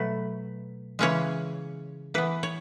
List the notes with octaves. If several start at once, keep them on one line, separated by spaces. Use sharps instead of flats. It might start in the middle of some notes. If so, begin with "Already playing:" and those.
Already playing: B2 F#3 A3 B4
C#3 E3 G#3 C#4 C#5
E3 B3 B4
C#5